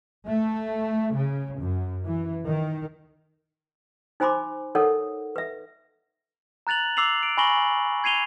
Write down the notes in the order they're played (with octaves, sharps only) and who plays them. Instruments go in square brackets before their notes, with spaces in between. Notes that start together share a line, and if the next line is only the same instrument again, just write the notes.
[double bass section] A3
C#3
F#2
E3
D#3
[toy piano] D#4 C5 G#5 B5 C6 D6
D#4 A4 A#4 C#5 F#5
B4 E5
[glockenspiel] A#5 F#6 A6 F7 F#7
D6 E6 C7 F7 F#7
D7
G#5 B5 C#6 A#6 F#7 G7
G#6 C7 D#7 F7 G7